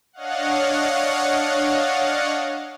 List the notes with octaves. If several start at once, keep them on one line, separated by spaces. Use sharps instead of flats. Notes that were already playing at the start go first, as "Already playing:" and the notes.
D4 C#5 D#5 F5 F#5